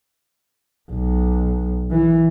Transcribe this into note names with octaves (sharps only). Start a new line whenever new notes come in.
B1
E3